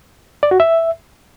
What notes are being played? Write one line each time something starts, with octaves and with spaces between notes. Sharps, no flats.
D5
F#4
E5